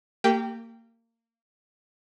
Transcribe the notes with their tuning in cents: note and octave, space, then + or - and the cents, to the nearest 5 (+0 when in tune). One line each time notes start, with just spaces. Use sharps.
A#3 -25 G4 +0 G5 +0